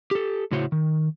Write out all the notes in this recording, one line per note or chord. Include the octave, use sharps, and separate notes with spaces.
G4 A4
A2 C#3 E4 F#4 C5 C#5
D#3